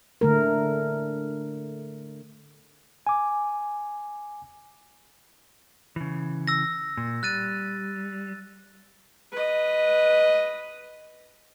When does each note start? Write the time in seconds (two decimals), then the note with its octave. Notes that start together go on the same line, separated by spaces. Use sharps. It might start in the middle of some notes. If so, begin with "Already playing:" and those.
0.21 D3 A3 A#4
3.07 G#5 D6
5.96 C#3 E3
6.47 E6 A#6
6.97 A#2
7.23 G3 F#6 A6 D#7
9.32 B4 D#5